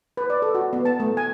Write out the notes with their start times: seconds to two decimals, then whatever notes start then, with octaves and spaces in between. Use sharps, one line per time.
0.17 B4
0.30 D5
0.42 A4
0.55 F#4
0.73 B3
0.85 A5
1.00 A3
1.17 G#5